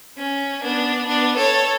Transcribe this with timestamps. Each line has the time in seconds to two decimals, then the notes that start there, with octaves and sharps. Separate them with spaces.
0.18 C#4
0.62 B3 D4
1.07 B3 D4
1.36 A4 C#5